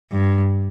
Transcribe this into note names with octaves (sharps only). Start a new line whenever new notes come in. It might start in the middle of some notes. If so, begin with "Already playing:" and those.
G2